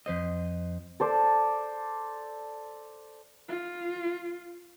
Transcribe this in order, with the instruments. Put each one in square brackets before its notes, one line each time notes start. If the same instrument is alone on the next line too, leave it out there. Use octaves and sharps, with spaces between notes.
[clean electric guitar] F2 C5 D#5
[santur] A4 C5 D5
[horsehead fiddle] F4